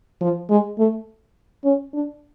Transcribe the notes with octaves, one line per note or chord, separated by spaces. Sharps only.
F3
G#3
A3
C#4
D4